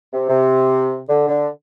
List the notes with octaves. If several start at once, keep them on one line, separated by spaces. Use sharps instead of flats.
C3
C3
D3
D3